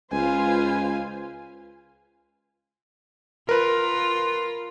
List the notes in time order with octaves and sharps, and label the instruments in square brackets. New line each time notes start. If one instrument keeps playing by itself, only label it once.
[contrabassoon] C#2 [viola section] F4 B4 C5 [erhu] G#5
[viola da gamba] F4 [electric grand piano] A#4 B4